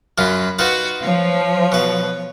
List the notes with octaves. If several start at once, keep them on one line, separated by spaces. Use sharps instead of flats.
F#2 F#3 F4 B5
D#4 F4 F#4 B4 F#5
F3 C#5
B2 B4